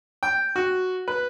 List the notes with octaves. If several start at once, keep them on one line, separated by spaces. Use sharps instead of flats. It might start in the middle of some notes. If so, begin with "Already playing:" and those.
G5
F#4
B4